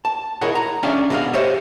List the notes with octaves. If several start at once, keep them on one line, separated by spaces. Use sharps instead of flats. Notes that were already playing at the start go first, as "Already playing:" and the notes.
A5
E4 G#4 A#4 C#5 D#5 F#5
A#5
G#3 C#4 D4 E5 F5 G#5
B2 F#4 G#4 D#5 F5
G4 C5 C#5 D#5 E5